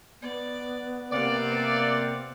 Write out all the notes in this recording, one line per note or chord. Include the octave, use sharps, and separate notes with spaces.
B3 D5
C3 A#3 C4 D5 F5 F#5